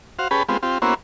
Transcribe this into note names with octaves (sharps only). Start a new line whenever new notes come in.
F#4 C5 F5
C#4 G4 G#4 B4 A5 B5
G#3 B3 C4 F4 G4
C4 F4 G4
A#3 B3 C#4 E4 F#4 C5